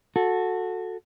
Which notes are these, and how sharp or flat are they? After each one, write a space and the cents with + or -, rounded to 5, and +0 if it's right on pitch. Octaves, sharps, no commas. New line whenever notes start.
F#4 -15 A4 +0